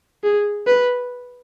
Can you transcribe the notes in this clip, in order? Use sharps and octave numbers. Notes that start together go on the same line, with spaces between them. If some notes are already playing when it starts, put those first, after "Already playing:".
G#4
B4